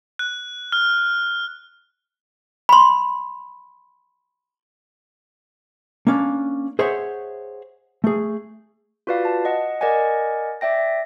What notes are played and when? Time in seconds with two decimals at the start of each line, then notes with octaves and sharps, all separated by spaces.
0.19 F#6
0.72 F6
2.69 B5 C6
6.07 A#3 C#4 D4
6.79 G#4 C5 C#5 E5 F#5
8.04 A3 G#4
9.07 F4 F#4 B4 D5 F5
9.25 A5
9.45 D#5 F#5
9.81 A#4 D5 D#5 F#5 G#5
10.61 D5 E5 G5 A#6